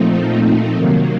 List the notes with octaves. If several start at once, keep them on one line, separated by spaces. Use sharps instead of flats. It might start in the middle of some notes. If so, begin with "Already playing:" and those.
Already playing: A#2 F3 A3 C4 D#4
C3 D#3 F#3 A#3